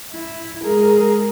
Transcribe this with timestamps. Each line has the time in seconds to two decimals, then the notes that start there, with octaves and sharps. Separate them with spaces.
0.11 E4
0.64 G#3 G#4 A#4